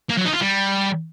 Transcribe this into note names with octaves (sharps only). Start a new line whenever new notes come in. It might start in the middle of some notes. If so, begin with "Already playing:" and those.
A#3
F#3
D#4
F4
G3